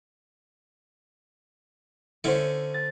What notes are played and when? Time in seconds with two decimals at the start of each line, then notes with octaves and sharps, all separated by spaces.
2.24 D3 A3 C#4 E4 C5
2.74 A6